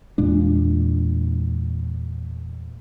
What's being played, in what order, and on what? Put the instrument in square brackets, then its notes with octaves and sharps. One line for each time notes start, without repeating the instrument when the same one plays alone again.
[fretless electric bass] E2 A#2 G#3 D4